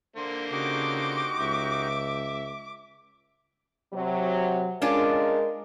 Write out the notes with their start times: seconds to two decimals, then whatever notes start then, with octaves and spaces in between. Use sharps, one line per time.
0.16 D3 A#3 C5
0.51 C#3 D#4 F#4 G4 D6
1.39 C#2 E5
3.94 C3 F#3
4.82 G#3 C#4 D4 F4 A#4